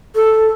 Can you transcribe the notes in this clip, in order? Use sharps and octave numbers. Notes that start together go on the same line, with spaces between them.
A4